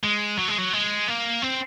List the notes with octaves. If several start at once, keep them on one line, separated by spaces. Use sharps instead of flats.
G#3
F#3
G#3
F#3
G#3
A#3
C4